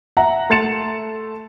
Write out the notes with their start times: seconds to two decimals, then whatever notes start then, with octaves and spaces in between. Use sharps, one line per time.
0.17 E5 F#5 A#5
0.50 A3 C6 A6 C#7 E7